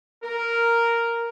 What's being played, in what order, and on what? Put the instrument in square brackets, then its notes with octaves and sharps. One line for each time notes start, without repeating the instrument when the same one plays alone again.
[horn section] A#4